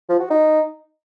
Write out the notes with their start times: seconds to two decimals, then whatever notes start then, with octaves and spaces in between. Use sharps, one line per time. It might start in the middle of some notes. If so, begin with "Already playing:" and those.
0.09 F3
0.20 F#4
0.31 D#4